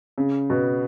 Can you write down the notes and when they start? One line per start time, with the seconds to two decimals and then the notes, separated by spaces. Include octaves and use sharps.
0.18 C#3
0.50 B2